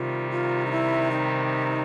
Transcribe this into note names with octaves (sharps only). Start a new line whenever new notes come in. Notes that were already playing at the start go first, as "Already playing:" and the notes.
Already playing: C3 D#3 G3 F4
F4
D#4
E4
D#4